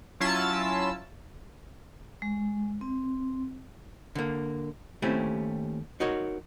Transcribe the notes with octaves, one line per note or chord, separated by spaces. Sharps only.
F#3 C#4 E4 F4 A5 E6
G#3
C4
D3 A#3
D#2 A3 C4 C#4 E4 G4
D#4 F#4 A#4 C#5